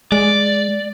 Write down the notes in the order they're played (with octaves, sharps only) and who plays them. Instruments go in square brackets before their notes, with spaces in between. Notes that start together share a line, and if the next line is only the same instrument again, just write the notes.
[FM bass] G#3 [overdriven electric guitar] D5